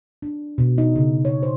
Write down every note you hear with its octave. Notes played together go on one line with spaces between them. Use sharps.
D4
B2
D#4
C#3
C#5
C5